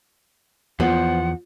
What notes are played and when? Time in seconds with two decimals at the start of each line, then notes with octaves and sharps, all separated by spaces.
0.80 E2 F3 B3 C5 F#5